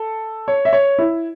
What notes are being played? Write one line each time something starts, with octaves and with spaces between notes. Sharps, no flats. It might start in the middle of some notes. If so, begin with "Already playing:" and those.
Already playing: A4
C#5
E5
C#5
E4